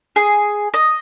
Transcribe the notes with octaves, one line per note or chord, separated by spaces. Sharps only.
G#4
D#5